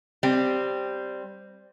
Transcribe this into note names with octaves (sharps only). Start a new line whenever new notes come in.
G3 C4